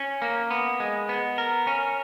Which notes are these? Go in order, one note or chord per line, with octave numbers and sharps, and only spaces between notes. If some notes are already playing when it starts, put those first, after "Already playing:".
Already playing: C#4
A#3
B3
G#3
B3
A#4
C#4